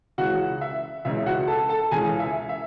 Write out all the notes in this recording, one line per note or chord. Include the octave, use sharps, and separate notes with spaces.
C#2 C#3 E3 F#4 F#5
E5
C#2 C#3 E3 E5
F#4 F#5
A4 A5
A4 A5
C#2 C#3 E3 G#4 G#5
E5
E5